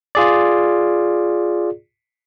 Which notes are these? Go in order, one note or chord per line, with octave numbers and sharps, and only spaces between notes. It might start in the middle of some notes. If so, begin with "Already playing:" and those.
F4 G#4 D5